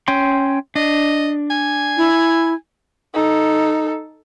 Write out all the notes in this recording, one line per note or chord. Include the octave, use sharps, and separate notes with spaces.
C#4 G5 C6
D4 D#5
G#5
E4
D#4 A4